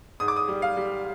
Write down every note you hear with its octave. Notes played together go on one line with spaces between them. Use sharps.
G#2 D#6
D6
D#6
G3
F5
G3